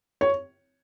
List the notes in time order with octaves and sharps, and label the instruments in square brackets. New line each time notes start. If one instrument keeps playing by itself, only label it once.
[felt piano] C#5